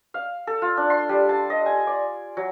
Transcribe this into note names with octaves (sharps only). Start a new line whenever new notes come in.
F5
A4
F4
D4
C6
G3
A5
D#5
G#5
D5
F#3